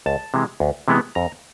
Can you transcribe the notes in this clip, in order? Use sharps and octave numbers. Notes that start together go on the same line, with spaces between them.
C#2 A5
C3 E3 G#3
D2
C3 E3 G#3 B3
F2 A#5